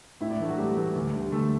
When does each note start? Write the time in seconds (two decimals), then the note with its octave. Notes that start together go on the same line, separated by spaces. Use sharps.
0.21 A2 E4 E5
0.30 D4 D5
0.40 E3 A3
0.48 F#3 F#4
0.58 A2 G3 G4
0.77 E3 A3
0.96 D2
1.13 D3 G3
1.32 D2 A3 A4